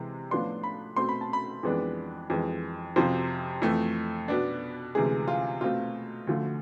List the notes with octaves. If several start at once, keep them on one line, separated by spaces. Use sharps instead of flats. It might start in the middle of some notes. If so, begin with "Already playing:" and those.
Already playing: C3 E3 G#3 C4
A2 F3 B3 D4 C6
B5
B2 A3 C4 C6
B5
A5
B5
F2 E3 G#3 B3 D4
F2 E3 G#3
F2 C3 F3 C5
F2 E3 A3
B2 B3 D4
D2 C3 E3 G#3 G#4
F4
B2 A3 C4 F4
D2 D3 F3 A3